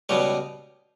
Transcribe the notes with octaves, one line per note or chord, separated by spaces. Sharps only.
C#2 B2 G3 B3 C#5